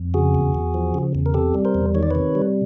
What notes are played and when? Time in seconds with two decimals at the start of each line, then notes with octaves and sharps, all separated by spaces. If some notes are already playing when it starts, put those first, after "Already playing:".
Already playing: F2
0.14 C#3 F#4 G#4
0.35 E2
0.55 E2
0.74 F3
0.94 C#3
1.15 E2
1.26 A#4
1.34 C3 G4 A4
1.54 G3
1.65 A#4 C5
1.75 E2
1.95 D#3 C#5
2.03 D5
2.11 C3 B4 C#5
2.35 G3